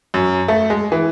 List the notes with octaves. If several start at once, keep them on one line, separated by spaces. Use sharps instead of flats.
F#2
A3
G#3
E3